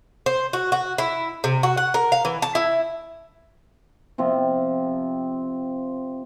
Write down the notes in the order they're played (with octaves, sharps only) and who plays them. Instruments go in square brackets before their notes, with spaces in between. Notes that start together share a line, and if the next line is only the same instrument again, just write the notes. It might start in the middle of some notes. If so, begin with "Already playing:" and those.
[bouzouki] C5
F#4
F#4
E4
C3
F#4
F#5
A#4
F5
E3
A5
E4
[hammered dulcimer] C3 F3 C4